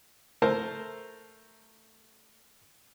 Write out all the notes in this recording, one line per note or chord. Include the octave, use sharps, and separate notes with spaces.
A3 A#4 C5 A5